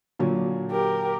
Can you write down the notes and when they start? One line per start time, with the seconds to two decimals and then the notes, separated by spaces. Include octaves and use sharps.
0.19 A#2 D3 F#3
0.71 G4 A#4